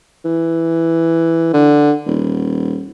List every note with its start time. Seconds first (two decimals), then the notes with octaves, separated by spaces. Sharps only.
0.25 E3
1.53 D3
2.07 D#1